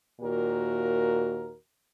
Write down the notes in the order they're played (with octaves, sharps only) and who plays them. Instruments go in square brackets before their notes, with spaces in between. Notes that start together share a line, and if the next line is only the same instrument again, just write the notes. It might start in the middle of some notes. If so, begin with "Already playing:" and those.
[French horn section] D#2 A#2 F#4 A#4